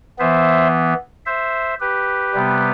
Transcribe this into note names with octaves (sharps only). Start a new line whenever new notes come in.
E3 B3 C5 E5
C5 E5
G4 B4
C3 G3 B3